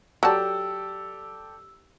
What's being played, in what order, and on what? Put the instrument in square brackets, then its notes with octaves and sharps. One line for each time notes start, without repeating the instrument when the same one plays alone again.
[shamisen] F#3 A5 [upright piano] G4 A4 D5 [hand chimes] E6